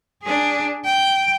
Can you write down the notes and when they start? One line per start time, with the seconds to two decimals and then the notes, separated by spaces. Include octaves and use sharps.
0.23 D4 G#4
0.85 G5